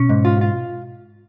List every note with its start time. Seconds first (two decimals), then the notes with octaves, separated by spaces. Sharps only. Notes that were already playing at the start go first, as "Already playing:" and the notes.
Already playing: B2 C#4
0.09 G#2
0.25 F4
0.41 F4